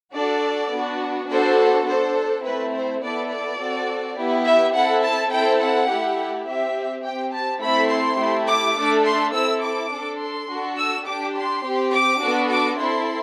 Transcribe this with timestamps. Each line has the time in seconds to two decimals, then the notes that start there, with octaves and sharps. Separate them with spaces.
0.15 D4 F#4 A4 D5
0.72 B3 D4 F#4
1.30 B3 D4 F#4 A4 C5
1.87 D4 A4 C5
2.44 A3 C4 E4 B4
2.74 C5
3.02 B3 E4 A4 D5
3.31 D5
3.59 C4 F#4 A4
4.17 B3 E4 G4
4.45 E5
4.74 C4 E4 A4 F#5
5.03 A5
5.31 C4 E4 A4 G5
5.60 F#5
5.89 A3 E4 G4
6.46 C4 G4 E5
7.04 C4 G4 G5
7.33 A5
7.61 A3 C4 E4 A4 B5
7.90 C6
8.19 A3 E4 G4
8.48 D6
8.76 A3 D4 A4
9.05 C6
9.34 C4 E4 A4 E6
9.63 D6
9.92 D4 A4
10.20 C6
10.49 D4 F#4 A4
10.78 E6
11.06 D4 G4 D6
11.35 C6
11.64 C4 G4
11.93 D6
12.21 B3 D4 F#4 A4
12.50 D6
12.78 C4 E4 A4 C6